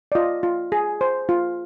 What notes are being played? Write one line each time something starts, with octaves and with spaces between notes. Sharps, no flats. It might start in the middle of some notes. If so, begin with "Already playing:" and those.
D5
F4 D#5
F4
G#4
C5
F4